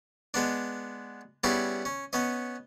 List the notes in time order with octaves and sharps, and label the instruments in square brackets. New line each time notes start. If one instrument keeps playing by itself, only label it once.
[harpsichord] G#3 B3 D4
G3 B3 C#4 E4 G#4
C#4
B3 C#4 D#5